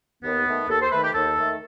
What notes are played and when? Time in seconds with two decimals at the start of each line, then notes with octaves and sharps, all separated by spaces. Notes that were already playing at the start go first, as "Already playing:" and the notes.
0.23 D#2 B3
0.47 D#3 A3
0.69 D#2 A4
0.81 C5
0.91 D#3 A3 B4
1.03 G4
1.14 D#2 A4
1.38 D#3 A3